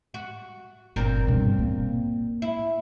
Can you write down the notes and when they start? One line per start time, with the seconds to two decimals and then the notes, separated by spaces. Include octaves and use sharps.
0.14 F#4
0.96 G1 A#2 C4 A#4
1.27 G2 B2
1.59 A#3
2.42 E4